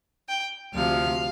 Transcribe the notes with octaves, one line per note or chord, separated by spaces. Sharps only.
G5
D2 C3 F3 F5